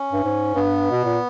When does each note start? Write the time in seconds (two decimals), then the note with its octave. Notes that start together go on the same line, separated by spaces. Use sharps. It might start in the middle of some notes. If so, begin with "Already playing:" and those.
Already playing: C#4
0.13 G2
0.24 G#2
0.55 G2 B3
0.91 B2
1.04 A#2